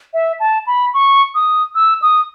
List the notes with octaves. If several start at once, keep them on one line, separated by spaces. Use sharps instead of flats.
E5
A5
B5
C#6
D#6
E6
D#6